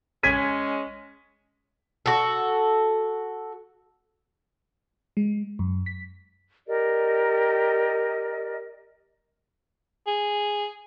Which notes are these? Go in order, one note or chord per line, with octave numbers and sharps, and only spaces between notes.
G#3 C#4 G#6 B6 D#7
F#4 A4
G#3
F#2
B6
G4 A#4 D5 D#5
G#4